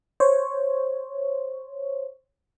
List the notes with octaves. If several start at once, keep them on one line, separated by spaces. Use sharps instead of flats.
C5 C#5